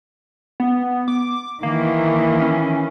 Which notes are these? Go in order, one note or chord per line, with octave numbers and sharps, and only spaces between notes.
B3
D6
D#3 E3 A#3
C#4